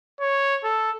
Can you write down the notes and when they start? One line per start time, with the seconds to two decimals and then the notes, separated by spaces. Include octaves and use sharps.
0.20 C#5
0.64 A4